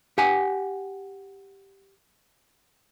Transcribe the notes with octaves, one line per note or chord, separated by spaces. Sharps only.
G4 F#5 G#5